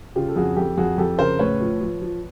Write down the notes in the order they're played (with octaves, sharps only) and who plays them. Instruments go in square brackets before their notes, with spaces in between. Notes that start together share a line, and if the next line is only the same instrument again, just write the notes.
[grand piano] C#3 F4 G4
A4
F2 F#4 G#4
F2 G4 A4
F2 F#4 G#4
F2 G4 A4
C#3 A#4 C5
A2 B4 C#5
F3
F3
F3